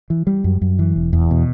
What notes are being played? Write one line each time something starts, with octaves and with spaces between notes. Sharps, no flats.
E3
G3
F#2
F#2
E3
E1
E2
B2